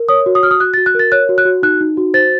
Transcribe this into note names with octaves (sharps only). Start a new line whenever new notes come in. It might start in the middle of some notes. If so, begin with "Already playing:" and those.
Already playing: A#4
C#5 D#6
F#4
D#6
F#4 F6
D#6
F#4 F#6
A6
F#4
F#6
A#4 A6
C#5 F#6
F#4
F#6
F#4
D#4 F#6
D#4
F#4
C5 A6